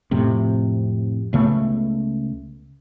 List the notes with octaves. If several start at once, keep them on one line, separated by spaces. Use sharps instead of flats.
F2 A2 C3
C#2 C#3 A3 B3